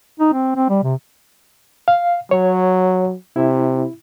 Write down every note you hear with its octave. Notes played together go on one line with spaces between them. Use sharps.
D#4
C4
C4
G3
C3
F5
F#3 C#5
C3 E4